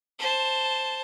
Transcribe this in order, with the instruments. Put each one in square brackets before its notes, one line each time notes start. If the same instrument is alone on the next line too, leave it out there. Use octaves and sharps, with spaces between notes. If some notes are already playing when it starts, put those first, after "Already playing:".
[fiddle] C5 A5